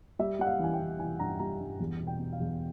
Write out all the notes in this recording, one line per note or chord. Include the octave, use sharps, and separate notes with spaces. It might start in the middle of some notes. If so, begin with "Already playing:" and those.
G3 E5
G3 F#5
F5
E3 G#5
G5
E3
E3 G#5
G2 A#5
G3 A#5
G2
E2
B2
G5
B2
F5
E2